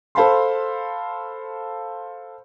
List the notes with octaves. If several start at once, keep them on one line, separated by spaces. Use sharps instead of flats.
A4 C5 F5 A5 B5 C6